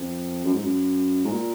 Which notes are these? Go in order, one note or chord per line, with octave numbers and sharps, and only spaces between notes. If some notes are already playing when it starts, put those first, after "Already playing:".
Already playing: F2
F#2
G#2
F#2
G#2
A#2